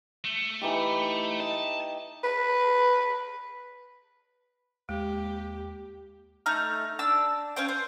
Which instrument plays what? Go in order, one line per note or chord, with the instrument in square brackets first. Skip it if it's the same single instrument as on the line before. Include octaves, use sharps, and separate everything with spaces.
[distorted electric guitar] A3
[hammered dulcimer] E3 D#4 G4
[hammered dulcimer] D#5 [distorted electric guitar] A5
[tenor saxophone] B4
[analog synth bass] D#2 [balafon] G#3 [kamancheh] G4
[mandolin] A3 D#4 A#5 F6
D4 A5 E6
C#4 F4 C5 G5
C5